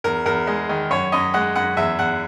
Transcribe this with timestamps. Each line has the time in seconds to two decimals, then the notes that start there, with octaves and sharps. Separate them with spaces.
0.04 E2 A#4
0.26 E2 A#4
0.47 G#3
0.69 D#3
0.90 F#2 C#5
1.12 F#2 D#5
1.34 G#3 F#5
1.55 F#2 F#5
1.77 E2 E5
1.99 E2 F#5